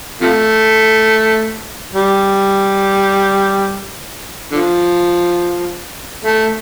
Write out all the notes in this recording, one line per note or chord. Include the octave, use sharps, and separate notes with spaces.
C3 F3 A3
G3
D3 F3
A3